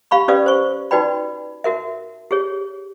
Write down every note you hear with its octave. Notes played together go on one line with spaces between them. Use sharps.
G4 F5 B5 C#6
C#4 G4 B4 D5 F5 D#6
C5 C#6
D#4 F#4 B4 D5 G5 B5
F#4 A#4 E5
G4 G#4 C#5